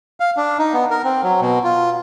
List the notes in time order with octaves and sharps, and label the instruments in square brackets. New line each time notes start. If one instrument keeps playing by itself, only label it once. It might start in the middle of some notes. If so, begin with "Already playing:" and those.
[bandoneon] F5
D4
D#4
B3
A#4
C4
F#3
B2
F4